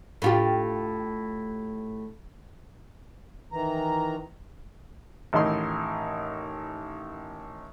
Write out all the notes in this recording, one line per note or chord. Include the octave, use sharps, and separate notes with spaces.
A2 F4 G4
D#3 E3 A#5
A1 D#3 D#4 E4 C6